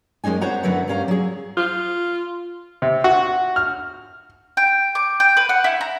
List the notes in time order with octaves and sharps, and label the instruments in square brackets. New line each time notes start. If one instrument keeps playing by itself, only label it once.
[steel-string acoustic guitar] F#2 G#3 C#4 D#4 G#5
B3 C5 C#5 F#5 A#5
F#2 D3 F#3 E4 B4 F#5
G2 G3 C#4 F5 A#5
F#3 G#4
[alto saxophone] F4
[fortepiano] C3
F#4
F6
[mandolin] G5
D6
G5
B4
F#5
E4
A#5